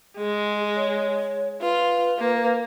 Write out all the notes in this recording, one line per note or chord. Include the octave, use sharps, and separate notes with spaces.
G#3 G#4
C#5
F4 B4
A#3